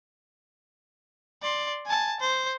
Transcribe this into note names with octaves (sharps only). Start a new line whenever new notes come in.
D5 C6
G#5 A5
C5